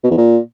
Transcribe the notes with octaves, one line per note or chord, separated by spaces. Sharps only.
B2
E2
A#2